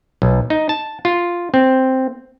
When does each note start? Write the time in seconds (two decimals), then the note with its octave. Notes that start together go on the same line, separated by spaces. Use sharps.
0.22 B1
0.50 D#4
0.69 A5
1.05 F4
1.54 C4